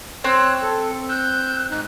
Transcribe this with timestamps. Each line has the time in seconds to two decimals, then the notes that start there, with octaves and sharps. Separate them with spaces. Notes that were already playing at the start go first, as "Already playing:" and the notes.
0.24 C4 C#5 E6 F#6
0.62 A4
1.09 E6 F#6 G6
1.71 G#2 D#4 F#6